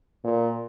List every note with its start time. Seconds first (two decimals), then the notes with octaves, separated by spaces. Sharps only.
0.24 A#2